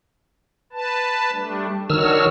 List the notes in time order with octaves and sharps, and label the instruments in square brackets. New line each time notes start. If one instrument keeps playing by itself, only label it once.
[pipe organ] B4 A5
G3 A3 D4
[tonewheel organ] D#3 E6 F6 [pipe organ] D4 F#4 C#5